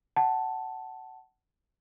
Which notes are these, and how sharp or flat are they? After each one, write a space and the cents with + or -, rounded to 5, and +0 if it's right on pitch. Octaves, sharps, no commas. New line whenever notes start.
F#5 +25 A5 +0